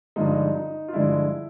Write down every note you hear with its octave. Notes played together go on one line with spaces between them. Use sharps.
G2 D3 F3 G#3 D#4
D#4
F4
G2 D3 F3 G#3 E4